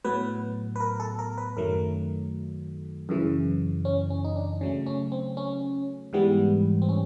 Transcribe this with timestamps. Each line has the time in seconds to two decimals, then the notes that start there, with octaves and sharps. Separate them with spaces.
0.04 A2 F#3 B3 B4
0.76 B4
0.80 A#4
1.00 A4
1.19 A#4
1.38 B4
1.57 F#2 D#3 F#3 A3 A#4
3.09 F#2 C#3 E3
3.85 C#4
4.10 C#4
4.25 D#4
4.36 D4
4.61 C#3 F#3 A3 C#4
4.86 C#4
5.12 C4
5.37 C#4
6.13 G#2 E3 G3 B3
6.82 C4
6.89 C#4